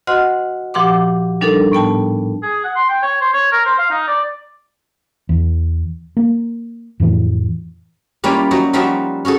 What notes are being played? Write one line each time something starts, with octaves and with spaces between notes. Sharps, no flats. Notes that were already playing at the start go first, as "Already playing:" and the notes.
F#4 C5 D#5 F#5 C6 F6
A#2 F3 G4 F#5 C6 D6
G3 D4 D#4 A4 A#4
A2 B3 G5 A5
G#4
F#5
C6
G5
C#5
C5
C#5
A#4
C5
F5
D#4
D5
E2
A#3
F2 A2 E3
G3 A#3 C#4 E4 F4
F#3 D#4 F#4
F3 G3 D#4 F#4 E5 F5
C#4 F#4 G#4 A4